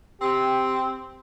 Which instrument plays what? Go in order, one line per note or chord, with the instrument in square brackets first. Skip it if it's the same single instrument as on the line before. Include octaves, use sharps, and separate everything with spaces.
[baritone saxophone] C4 [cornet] G4